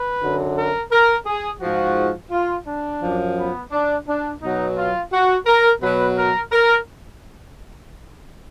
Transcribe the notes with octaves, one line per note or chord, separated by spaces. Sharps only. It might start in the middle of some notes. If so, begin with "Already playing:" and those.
Already playing: B4
F#2 D3 F#3
A#4
A#4
G#4
G#2 F3 F#4
F4
D4
F#2 F3
B3
D4
D4
B2 F#3 D#4
F4
F#4
A#4
B2 F#3 B4
A#4
A#4